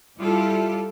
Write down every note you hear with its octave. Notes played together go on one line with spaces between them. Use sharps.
G3 E4 F4 G4 A4